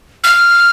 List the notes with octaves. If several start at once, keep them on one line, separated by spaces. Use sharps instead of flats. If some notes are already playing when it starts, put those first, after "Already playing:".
F6